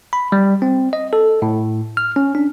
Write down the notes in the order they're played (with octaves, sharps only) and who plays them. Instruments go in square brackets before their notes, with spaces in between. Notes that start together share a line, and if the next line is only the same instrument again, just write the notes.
[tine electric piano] B5
G3
C4
D#5
A4
A2
F6
C#4
D4